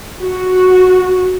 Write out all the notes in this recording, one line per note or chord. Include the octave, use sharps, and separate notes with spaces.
F#4